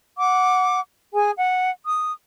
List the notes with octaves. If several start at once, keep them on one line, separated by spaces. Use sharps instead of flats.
F#5 D6
G#4 G#5
F#5
D#6